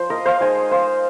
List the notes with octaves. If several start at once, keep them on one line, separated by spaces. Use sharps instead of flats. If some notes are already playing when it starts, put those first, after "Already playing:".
Already playing: F3 C5
A#4 D#5
C5 F5
G#3 D#4 D#5 G#5
C5 F5